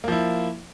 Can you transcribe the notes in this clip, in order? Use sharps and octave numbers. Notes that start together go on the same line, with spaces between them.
F3 A#3 E4